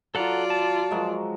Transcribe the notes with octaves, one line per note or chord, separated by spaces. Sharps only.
F#3 F4 A4 D5 F#5 A#5
A5
F3 F#3 G#3